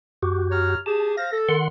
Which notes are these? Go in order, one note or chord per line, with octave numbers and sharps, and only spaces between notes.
F#2 F#4 G4
C#5 A#5 F6
G4 G#4 A5
C5 F5 A#6
A4
D#3 F#5 C6